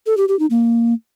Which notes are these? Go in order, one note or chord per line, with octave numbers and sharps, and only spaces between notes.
A4
G4
G4
D#4
A#3